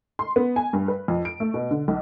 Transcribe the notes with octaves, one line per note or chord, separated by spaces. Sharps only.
C6
B3
G#5
G2
B4
F2
D7
A3
B2
D3
B1